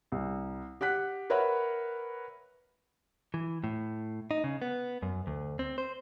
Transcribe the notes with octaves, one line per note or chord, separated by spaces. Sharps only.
C2
G4 F#5 F#6 B6
A#4 B4 C#5 E5 F#5 B5
E3
A2
D#4
C#3
B3
F#2
D2
C4
C5